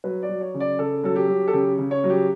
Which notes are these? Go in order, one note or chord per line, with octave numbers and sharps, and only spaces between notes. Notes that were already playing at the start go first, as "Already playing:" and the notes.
F#3 B4
D5
F#3
C#5
C#3
D5
C#3 A4
F#3 A4
G4
F#3
A4
C#3 G4
C#3
C#5
F#3
G4